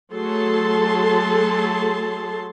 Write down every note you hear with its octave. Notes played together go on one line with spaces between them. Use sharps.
F#3 A3 G#4 A4 A5 C6